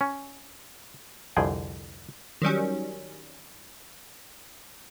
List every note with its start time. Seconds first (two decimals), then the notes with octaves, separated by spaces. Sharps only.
0.01 C#4
1.37 C2 F2 D3 G#4 G5
2.42 D#3 F#3 G3 C#4